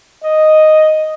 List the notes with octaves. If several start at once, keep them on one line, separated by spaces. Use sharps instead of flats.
D#5